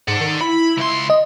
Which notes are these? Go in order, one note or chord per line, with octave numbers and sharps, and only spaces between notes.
G#2 D5 F#5
D#3
E4 B5
C#2 C6
D#5